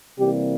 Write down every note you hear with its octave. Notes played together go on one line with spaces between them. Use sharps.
C3 E3 G3 A#3 G4